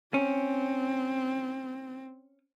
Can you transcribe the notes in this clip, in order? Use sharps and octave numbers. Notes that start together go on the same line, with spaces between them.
C4 C#4